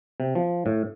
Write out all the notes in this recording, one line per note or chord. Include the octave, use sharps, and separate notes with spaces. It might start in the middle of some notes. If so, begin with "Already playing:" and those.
C3
F3
A2